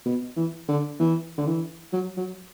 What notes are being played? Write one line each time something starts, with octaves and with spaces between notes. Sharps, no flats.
B2
E3
D3
E3
D3
E3
F#3
F#3